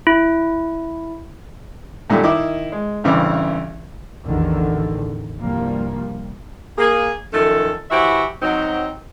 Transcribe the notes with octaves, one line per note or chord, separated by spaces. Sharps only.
E4
F#2 A#2 D#3 G3 A3
D#3 D#4 E4 D#5 D6
G#3
A1 G2 C#3 E3 C4 D6
A1 E2 D3 D#3
C2 G2 F3 G3 A#3
A#3 G#4
F#2 D#3 F3 A3 A4
E3 E4 F#4 G4 C5 E5
F#3 C4 D#4